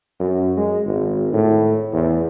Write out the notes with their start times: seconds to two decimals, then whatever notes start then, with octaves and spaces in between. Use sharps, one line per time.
0.20 F#2
0.57 G#3
0.86 G#1
1.33 A2
1.93 E2